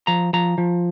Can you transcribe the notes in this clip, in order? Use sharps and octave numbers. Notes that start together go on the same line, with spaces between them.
F3 A#5
F3 A#5
F3